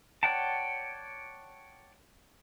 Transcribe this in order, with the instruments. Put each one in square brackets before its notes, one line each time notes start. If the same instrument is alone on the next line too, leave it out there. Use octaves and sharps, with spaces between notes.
[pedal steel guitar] C#5 D5 F#5 G5 A5